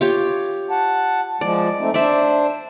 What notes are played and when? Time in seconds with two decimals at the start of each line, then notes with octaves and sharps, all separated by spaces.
0.01 F4 G4 C#5
0.71 F#5 A5
1.41 F3 G#3 D5
1.79 A3 C4 D#4
1.94 D4 C5 D5 E5